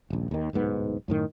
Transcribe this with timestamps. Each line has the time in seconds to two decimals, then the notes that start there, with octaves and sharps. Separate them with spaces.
0.10 D#1 A#1
0.31 D#2 D#3
0.53 D1 B1 G#2 B3
1.08 F#2 A2 D#3